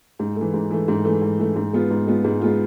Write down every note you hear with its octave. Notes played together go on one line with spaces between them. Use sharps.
G#2
E3 A3
G#2
E3 A3
G#2
E3 A3
G#2
E3 A3
G#2
G#3 B3 F4
G#2
G#3 B3 F4
G#2
G#3 B3 F4